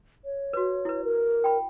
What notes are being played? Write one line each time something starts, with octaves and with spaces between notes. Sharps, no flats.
C#5
F#4 B4
E4 B4
A#4
G5 B5